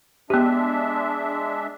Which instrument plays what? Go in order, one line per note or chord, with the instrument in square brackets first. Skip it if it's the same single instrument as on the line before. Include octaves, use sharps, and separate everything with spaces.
[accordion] G#3 D4 E5 [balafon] B3 G4